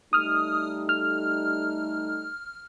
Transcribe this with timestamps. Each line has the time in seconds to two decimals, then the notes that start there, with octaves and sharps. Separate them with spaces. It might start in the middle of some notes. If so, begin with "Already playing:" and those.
0.13 G3 A3 D#4 D#6 F6
0.89 F6